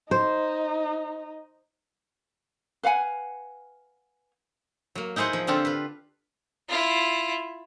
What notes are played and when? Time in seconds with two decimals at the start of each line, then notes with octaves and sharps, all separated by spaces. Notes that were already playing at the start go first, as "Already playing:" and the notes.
0.11 D#4 C5
2.83 B4 F5 F#5 G#5
4.95 F#3 A#3
5.16 D#4 E4 G#4 C5 F#5
5.33 F3
5.47 D3 C4 D4 F4 G4 A4
5.65 F4 B4
6.69 E4 F4